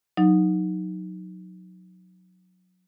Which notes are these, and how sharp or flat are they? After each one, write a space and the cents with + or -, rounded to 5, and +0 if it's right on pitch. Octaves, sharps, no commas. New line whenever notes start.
F#3 -20 D#4 +0